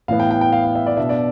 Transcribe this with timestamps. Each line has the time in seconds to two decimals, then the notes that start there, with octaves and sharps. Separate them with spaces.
0.08 A2 E3 B3 F5
0.20 G5
0.31 G5
0.41 G5
0.52 F5
0.64 F5
0.75 E5
0.86 D5
0.97 B2 B3 D4 E5
1.09 D5